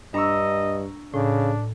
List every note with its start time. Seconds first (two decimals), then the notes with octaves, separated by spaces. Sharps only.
0.14 G2 D4 D#5 A#5 C#6 E6
1.14 A2 C#3 D4